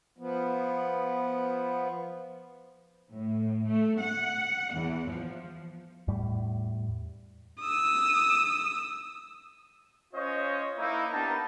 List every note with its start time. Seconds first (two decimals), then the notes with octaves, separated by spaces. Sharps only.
0.18 F3 B3
3.12 A2
3.67 A3
4.00 F#5
4.74 E2
5.07 F3
6.08 E2 A2 G3
7.60 D#6 E6
10.13 C#4 F4 C5 C#5 D#5
10.78 A#3 D#4 E4
11.11 B3 D4 D#4 G4 A#4 A5